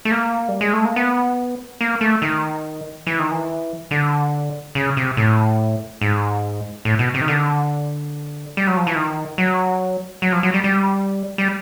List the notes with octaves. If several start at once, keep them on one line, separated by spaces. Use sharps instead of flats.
A3
A#3
G3
G#3
A3
A#3
B3
A#3
A3
D#3
E3
D#3
E3
D3
C#3
C3
A2
G#2
A2
B2
C3
D#3
D3
G3
F#3
F3
E3
D#3
F#3
F#3
F3
F#3
G3
G3
G3